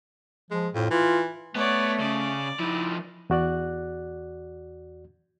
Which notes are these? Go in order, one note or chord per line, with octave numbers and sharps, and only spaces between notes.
F3 G#3
F2 A2
E3 F4
A3 B3 C#5 D5
C#3 D5
F3 D#4 E4
E2 F#4 D5 F#6